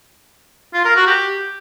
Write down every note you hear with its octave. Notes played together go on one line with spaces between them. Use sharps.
F4
A#4
F#4
G4